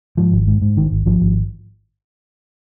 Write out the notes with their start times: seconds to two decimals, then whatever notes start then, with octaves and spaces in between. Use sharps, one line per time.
0.17 G#2 F3
0.32 G#1
0.47 G#2
0.62 G#2
0.76 G#1 D#3
0.91 G#1
1.06 G#1 F3
1.20 G#1